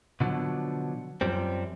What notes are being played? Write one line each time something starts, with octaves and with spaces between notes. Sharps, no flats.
B2 D3 F3 F#3
F#2 F3 G3 C4